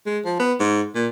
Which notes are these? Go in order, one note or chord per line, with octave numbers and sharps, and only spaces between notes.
G#3
F3
B3
G#2
A#2